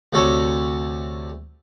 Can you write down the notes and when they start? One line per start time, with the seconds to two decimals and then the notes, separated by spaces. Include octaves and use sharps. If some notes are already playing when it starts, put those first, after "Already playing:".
0.13 D2 C3 A4 C#5